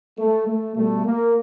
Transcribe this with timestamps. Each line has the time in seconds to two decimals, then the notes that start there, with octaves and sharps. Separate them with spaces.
0.19 A3
0.48 A3
0.76 B2 G3 A3
1.05 A#3